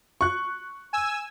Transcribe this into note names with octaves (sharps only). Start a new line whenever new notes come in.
C#6 F#6
G#5 E6